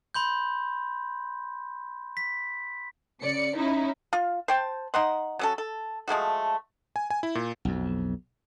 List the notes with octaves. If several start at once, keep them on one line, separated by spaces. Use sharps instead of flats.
B5 C6 G6
B6
C#3 D5 C#7
C#4 D#4 E4
F4
C5 G5 A5
D#4 F#5 C6
F#3 C#4 A4
A4
F3 G#3 A3 F#4
G#5
G#5
E4
A#2
B1 F2